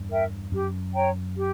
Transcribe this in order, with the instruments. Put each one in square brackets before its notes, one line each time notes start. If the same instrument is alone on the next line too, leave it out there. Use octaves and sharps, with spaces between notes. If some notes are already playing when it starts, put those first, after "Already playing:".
Already playing: [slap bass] E2 G2
[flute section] A#4 E5 G5
[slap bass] F#2 [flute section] G4
[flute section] C#5 G5 A#5
G4